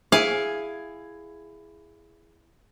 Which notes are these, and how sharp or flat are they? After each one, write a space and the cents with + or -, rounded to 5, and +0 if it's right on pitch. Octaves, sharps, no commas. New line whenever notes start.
E4 +15 G#4 +0 F5 +15